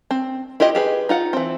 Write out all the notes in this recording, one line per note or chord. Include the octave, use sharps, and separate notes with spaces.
C4
E4 F4 G4 D#5
G4 G#4 B4
D#4 F4 F#5
E3 C4